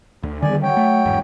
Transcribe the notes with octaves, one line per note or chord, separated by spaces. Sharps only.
D2
E2 D3 D#3 G3 D5 G#5
F#3 C#5 G5
A3
G1 E2 G#2